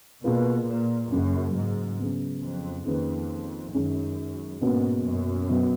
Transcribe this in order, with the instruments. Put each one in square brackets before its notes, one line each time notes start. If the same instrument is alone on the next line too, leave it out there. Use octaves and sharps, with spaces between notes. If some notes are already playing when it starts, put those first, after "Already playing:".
[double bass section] B2 [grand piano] A#3 F4 G#4 B4
[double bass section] A#2
[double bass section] F#2 [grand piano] C#3 F#3 A#3 C#4
[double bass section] G#2
[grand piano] C#3 F#3 B3
[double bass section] F2
[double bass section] F2 [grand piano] D#3 A#3 C#4 G#4 B4
[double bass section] F#2 [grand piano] D#3 G#3 C#4
[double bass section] G#2 [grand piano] B2 A#3 C#4 F#4 B4
[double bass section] F#2
[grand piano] B2 F#3 B3 F#4